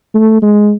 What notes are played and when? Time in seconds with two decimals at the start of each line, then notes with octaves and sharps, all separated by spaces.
0.15 A3
0.42 G#3